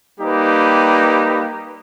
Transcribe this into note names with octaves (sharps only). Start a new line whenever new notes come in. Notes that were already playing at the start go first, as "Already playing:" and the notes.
G3 A#3 D#4 G4 B4